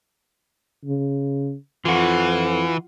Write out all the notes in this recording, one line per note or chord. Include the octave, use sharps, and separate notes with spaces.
C#3
F2 E3 F4 F#5